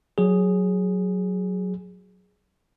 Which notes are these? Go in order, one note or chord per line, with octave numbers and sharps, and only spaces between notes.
F#3 G#4